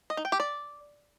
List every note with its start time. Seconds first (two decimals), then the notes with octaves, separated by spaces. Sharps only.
0.10 D#5
0.17 D#4
0.25 G5
0.32 G4
0.40 D5